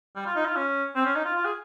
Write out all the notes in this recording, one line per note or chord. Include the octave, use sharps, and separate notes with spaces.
G3
F4
D#4
F4
C#4
C4
C#4
D#4
F4
F4
G#4